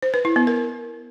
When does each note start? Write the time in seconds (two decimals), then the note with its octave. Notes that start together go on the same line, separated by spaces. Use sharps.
0.02 C5
0.14 B4
0.25 E4
0.36 B3
0.47 A#4